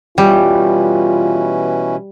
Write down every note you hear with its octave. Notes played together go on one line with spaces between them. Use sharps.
B2 E3 G3 C#4 F4